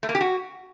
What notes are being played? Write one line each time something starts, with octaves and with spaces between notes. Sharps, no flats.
A3
A#3
G4
F#4